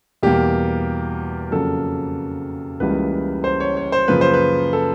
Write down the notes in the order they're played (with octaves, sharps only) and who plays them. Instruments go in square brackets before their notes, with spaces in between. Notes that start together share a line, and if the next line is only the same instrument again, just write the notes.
[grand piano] E2 B2 G3 A#3 G4
F2 C#3 F#3 A#3 A4
C#2 C#3 E3 G3 A#3 B4
C5
C#5
C#5
C5
F#2 C#3 F3 A#3 B4
C5
B4
A4